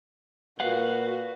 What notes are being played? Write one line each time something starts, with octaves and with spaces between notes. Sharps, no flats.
A#2 F#4 B4 F5 F#5